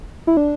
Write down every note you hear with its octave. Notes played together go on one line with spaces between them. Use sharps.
E4
D4